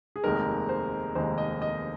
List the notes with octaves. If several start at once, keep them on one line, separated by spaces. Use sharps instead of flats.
G#4
F1 D#2 D#3 G#3 A#4
C5
F1 D#2 D#3 G#3 C5
D#5
D#5